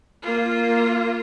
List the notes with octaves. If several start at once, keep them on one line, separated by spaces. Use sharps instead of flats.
A#3 F4